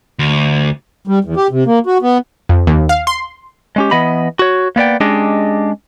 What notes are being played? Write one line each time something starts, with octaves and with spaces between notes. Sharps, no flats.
D2
G3
E2
G4
C3
A#3
F#4
B3
F2
D#2
F5
C6
G#3 C#4 G4
E3 B3 D#5 B5
F#4 C#5
A#3 B3 D5 G5
G#3 C#4 D4 G4 G#4 D#5